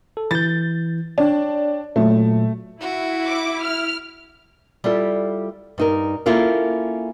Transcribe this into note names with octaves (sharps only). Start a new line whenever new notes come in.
A4
E3 G6 A6
D4 C#5 G5
A#2 F#3 A3
E4 F#4
D6
F6
G3 E4 F4 A4
G2 D#4 A#4
A#3 C#4 E4 F4 A4 A#4